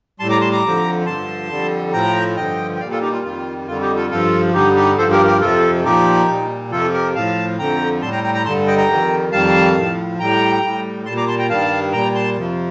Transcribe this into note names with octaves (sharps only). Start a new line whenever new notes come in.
A2 G3 A5 C6
A#5 D6
A5 C6
A#5 D6
F2 D3 F3
G2 D3 F3 A5 C6
F2 D3 G3
A2 F3 G5 A#5
G2 D3 F3 D#5 G5
G5
A#2 G3 D5 F5
F4 A4
D#4 G4
F4
F2 D#3 G3 F4
F2 D3 G3 F4
D#4 G4
F4 A4
G2 F3 F4 A4
G2 D3 G3 D#4 G4
D#4 G4
G2 F3 A4 C5
G4 A#4
G4 A#4
F2 C3 F3 F4 A4
A#2 F3 D#4 G4
A#2 G3
F2 C3 F3 F4 A4
G4 A#4
A2 F3 F5 A5
F2 D3 F3 G5 A#5
A2 G3 A5 C6
G5 A#5
G5 A#5
G5 A#5
G2 D3 G3 A5 C6
D#5 G5
G5 A#5
F2 D#3 G3
F2 D#3 G3 F5 A5
A2 F3
A2 G3 G5 A#5
A2 G3
A#2 G3 A5 C6
A#5 D6
A5 C6
G5 A#5
G2 D#3 G3 F5 A5
A#2 G3 G5 A#5
A5 C6
F2 C3 F3